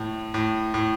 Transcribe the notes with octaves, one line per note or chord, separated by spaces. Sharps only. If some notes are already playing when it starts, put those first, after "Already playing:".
Already playing: A2
A2
A2